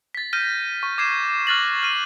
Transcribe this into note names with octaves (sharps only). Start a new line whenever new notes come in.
A6 B6
F6 G6 A#6 D#7
C#6
D6 G#6 C7 E7
C#6 F6 F#6 A6 A#6 F#7
F6 D#7